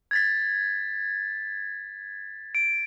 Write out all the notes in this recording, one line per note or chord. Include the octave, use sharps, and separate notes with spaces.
G#6 A6 B6
D7